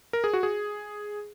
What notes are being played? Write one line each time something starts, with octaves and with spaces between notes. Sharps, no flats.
A#4
G#4
F#4
G#4